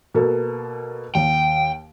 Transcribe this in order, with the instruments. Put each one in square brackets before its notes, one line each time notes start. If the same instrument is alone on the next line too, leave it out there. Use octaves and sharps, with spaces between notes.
[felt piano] B2 A#3 A4
[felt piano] D#2 [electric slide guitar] G5